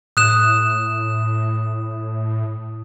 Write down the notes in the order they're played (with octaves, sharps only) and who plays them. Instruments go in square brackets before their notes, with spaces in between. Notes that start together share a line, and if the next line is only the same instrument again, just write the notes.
[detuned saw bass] A2 [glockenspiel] D#6 F#6 E7